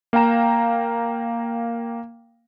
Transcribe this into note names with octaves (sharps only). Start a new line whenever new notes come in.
A#3 F5 G5 A#5 E7